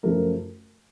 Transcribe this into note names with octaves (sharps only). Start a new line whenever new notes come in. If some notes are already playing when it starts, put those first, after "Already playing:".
F#2 C#3 F3 A3 A#4